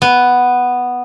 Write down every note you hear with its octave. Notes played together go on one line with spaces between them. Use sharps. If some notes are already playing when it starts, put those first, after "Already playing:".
B3